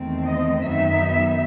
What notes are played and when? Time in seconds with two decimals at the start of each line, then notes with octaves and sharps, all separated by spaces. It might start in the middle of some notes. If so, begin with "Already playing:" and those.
Already playing: E2 D#3 A3 C4
0.26 D#5
0.62 F#2 D#3 F#3 B3 D#4 E5